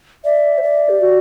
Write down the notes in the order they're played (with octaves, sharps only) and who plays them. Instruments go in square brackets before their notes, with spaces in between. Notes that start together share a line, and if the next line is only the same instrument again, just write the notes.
[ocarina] D5 [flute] E5
[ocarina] C5
D5
[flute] G4
F#4